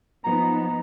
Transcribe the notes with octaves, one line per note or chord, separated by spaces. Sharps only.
F3 B3 D#4 A#5